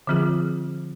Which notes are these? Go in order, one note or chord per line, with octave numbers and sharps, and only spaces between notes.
D3 F3 C4 F4 G#4